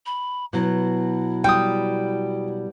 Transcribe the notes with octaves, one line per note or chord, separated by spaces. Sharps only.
B5
B2 F#3 E4
G3 G5 D#6